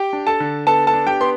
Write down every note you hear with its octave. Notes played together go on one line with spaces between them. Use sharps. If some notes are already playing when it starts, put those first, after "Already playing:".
Already playing: G4 G5
D4
A4 A5
D3
B3 A4 A5
A4 A5
D4
G4 G5
B3 C6